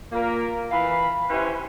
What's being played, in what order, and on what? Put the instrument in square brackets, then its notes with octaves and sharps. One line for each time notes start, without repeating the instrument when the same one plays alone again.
[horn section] A#2 A#3 A#4
E3 F5 B5
C#4 E4 G4 B4 C5